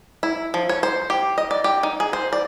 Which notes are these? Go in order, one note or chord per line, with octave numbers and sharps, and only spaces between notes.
E4
F3
C#5
C5
G4
D#5
D5
G4
D#4
G#4
C5
D5